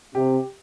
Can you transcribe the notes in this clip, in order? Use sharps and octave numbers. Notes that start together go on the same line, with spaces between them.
C3 G4